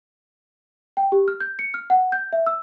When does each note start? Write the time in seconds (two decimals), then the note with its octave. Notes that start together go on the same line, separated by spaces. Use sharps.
0.97 G5
1.12 G4
1.28 F6
1.40 G6
1.59 C#7
1.74 F6
1.90 F#5
2.12 G6
2.33 E5
2.46 E6